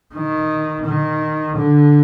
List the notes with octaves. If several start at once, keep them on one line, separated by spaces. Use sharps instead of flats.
D#3
D#3
D3